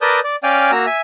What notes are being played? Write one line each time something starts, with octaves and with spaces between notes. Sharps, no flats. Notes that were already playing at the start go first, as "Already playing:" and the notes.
A#4 B4 D5 A5 D#6 G6
D5
C#4 D5 F5 G5 G#5 F6
A#3 F#4 A#5 E6
E5 G#5